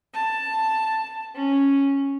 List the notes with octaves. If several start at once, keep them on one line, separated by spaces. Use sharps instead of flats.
A5
C#4